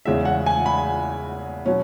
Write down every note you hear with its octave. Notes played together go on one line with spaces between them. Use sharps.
E2 C#3 G#3 E5
F#5
G#5
B5
B2 F#3 C#4